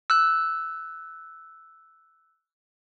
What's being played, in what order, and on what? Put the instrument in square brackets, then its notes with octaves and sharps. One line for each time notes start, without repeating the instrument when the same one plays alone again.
[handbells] E6 F#6